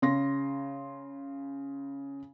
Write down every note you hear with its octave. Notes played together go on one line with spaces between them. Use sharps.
C#3 C6 A#6